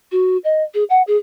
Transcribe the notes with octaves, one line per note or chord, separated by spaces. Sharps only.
F#4
D#5
G#4
F#5
G#4